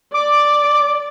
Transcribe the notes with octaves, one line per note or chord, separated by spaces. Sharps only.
D5 D6